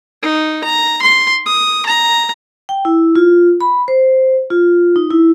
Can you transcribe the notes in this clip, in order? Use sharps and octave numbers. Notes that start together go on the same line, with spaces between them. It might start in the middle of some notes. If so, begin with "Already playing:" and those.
D#4
A#5
C6
D#6
A#5
G5
E4
F4
B5
C5
F4
D#4
E4